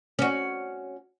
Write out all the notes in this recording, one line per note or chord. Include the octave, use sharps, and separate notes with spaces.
C#4 F#4